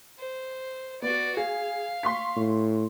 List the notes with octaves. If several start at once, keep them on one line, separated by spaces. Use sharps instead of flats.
C5
B3 F#4 D5
G#4 F5
C6 C#6 B6
A2